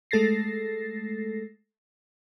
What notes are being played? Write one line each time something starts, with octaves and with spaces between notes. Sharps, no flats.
G#3 A3 A4 A6 A#6 C7